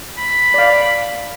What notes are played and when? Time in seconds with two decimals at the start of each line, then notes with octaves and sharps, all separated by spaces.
0.18 B5
0.54 D5 F5